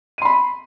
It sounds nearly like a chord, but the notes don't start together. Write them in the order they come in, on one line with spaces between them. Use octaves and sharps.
D#7 C6 B5